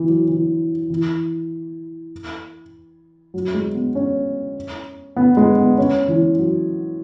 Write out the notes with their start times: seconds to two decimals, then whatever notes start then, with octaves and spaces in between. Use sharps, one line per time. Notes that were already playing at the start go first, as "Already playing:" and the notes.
Already playing: E3
0.08 F#3
0.29 E3
0.90 E3
3.34 F#3
3.54 G#3
3.75 B3
3.95 C#4
5.17 B3
5.37 G#3
5.58 B3
5.78 C#4
6.08 E3
6.39 F#3